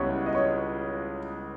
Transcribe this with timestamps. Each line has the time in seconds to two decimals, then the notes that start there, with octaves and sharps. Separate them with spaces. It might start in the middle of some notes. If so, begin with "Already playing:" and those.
Already playing: C#2 C#3 G3 B3 E4 C#5
0.26 D#5
0.35 C#5